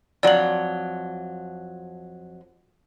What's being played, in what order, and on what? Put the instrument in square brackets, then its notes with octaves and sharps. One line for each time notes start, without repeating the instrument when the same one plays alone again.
[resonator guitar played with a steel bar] F2 F#3 [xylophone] D5 F#7